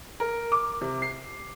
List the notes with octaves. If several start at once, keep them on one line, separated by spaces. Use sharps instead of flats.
A#4
D6
C3
C7